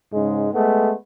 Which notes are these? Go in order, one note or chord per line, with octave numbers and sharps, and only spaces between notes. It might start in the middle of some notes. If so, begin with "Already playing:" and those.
G#2 C#3 G#3
G#3 A3 B3